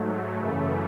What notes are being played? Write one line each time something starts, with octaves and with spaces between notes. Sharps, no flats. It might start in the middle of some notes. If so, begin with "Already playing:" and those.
Already playing: G#2 F#3 A3
F#2 C#3 E3 A3